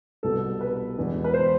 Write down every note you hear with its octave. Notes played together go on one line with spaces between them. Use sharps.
C2 B2 B3 A4
B4
E2 B2 G#3 B3
B4
C5